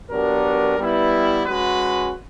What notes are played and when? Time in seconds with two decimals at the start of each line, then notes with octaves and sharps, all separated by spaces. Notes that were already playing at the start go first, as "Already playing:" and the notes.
0.10 F#3 B3 D4 G4 A#4
0.77 G3 B3 E4
1.45 G#3 C#4 F#4 B4